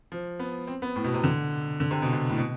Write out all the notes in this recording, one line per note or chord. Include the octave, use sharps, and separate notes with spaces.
F3
B3
C4
B3
A2
B2
C3
D3
D3
C3
B2
C3
A2
B2